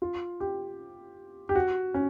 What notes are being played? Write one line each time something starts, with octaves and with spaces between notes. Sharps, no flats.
F4
G4
G4
F#4
C#4